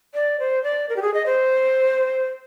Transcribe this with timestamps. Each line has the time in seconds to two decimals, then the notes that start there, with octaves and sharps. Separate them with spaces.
0.14 D5
0.39 C5
0.64 D5
0.89 A#4
0.96 G4
1.02 G#4
1.14 D#5
1.26 C5